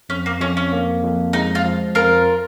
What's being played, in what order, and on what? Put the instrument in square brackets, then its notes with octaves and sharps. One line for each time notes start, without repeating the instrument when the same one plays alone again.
[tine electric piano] F2 [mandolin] C#4
[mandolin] A#3
[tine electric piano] F2 [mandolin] C#4
[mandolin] C#4
[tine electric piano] A#3
F2
[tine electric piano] G#3 [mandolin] D#4
[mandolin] F4
[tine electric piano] F3
[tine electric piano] F2 [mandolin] F4 A#4